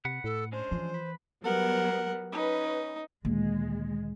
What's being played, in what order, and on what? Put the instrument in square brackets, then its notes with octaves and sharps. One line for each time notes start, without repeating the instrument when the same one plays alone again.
[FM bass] C3 [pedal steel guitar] B4 F#5
[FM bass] A2 [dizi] A4
[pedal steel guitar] G#3 C#4 D4 [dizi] C5
[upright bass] E3 [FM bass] F3
[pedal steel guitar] B4
[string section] F#3 G3 B3 [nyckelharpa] A#4 F#5
[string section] C#4 B4 [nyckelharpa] D#4
[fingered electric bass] D2 A#2 D#3 [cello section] G#3 [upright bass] A#3